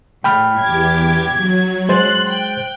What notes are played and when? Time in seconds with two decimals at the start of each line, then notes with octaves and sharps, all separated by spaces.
0.24 A2 G5 B5 F6
0.61 E2 G4 D6 G#6
1.36 F#3
1.89 G#3 C5 C6 F#6 A6
2.30 G5 F#6